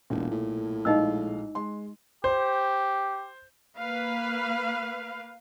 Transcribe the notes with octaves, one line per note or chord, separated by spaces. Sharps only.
E1 B1 A#2
A2
A#1 G#3 D#4 D#5 F5 E6
G#3 C6
G4 C5
A#3 B4 F5